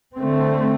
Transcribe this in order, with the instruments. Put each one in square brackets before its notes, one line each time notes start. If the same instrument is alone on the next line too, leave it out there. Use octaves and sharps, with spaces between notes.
[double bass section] D3 A3 C4